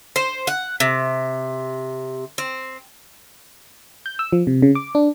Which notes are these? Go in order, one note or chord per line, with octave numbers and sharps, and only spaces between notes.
C5
F#5
C3
C4
G6
E6
F3
C3
C#3
D6
D4